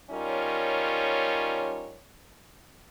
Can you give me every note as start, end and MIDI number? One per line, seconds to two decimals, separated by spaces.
0.11 1.97 55
0.11 1.97 61
0.11 1.97 63
0.11 1.97 65
0.11 1.97 70
0.11 1.97 73